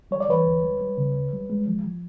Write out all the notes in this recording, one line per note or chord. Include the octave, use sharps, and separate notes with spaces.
G3 C#5
D5
E3 B4 C#5
D2
G3
G3
C#3
D2
G3
G#3
F3
F3